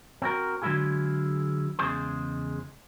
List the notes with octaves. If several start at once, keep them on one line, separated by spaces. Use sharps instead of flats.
C4 F#4 A#4
D3 F#3 G#3 E4 F4 G#4
E2 C#3 G#3 G#4 C5